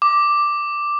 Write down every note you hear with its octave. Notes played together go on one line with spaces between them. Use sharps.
D6